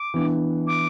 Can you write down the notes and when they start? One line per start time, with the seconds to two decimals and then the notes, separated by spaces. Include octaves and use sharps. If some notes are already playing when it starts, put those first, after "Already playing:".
Already playing: D6
0.14 E3 B3 D4
0.67 D6